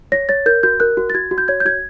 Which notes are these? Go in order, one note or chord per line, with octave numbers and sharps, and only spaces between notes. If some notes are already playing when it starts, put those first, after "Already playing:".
C#5 A#6
C#5 A6
A#4 G6
F#4 G6
A#4 F#6
F#4
A6
F#4 G#6
F#4
G6
C#5 G#6
G6
F#4 G#6